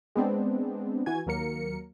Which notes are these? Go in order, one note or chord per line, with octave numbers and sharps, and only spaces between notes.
G#3 B3 C4 D4
E3 F#4 G#5 G#6
D#2 F#3 A#3 A#4 C#7